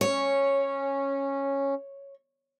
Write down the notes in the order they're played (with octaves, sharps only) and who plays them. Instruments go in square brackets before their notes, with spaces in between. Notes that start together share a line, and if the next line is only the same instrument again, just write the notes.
[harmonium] C#4 [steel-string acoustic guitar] C#5